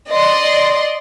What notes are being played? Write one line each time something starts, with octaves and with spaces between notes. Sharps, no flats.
D5 D#5 C6